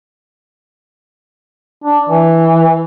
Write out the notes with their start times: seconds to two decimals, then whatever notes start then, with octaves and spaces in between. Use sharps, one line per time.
1.84 D4
2.09 E3